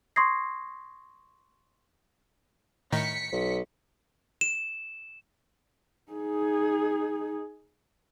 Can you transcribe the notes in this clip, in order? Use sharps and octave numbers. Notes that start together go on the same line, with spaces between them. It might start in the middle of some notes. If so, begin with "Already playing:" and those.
C6 C#6 D#6 G#6 A#6 C7
A2 D#3 D#4 B6 C#7
B1
E7
D#4 G#4